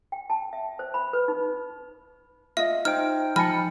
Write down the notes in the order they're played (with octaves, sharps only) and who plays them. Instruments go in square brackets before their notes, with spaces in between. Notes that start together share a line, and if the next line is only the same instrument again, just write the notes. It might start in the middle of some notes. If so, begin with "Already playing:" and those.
[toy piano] G5
A5
E5
C5
B5
B4
D#4
[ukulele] F4 D#5 [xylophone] E5
[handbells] D#4 C5 G5 [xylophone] F6
[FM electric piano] F3 A5 C#7 [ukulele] D#5 G#5 B5 [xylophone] F6